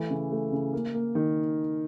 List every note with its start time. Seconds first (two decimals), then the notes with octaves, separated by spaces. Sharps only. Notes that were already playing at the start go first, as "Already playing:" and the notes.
Already playing: E3 A3
0.10 C#3
0.32 A3
0.52 C#3
0.73 A#3
0.94 A#3
1.15 D#3